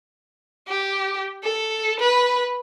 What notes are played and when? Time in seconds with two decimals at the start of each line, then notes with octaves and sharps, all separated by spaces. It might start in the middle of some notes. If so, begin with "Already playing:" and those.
0.68 G4
1.43 A4
2.00 B4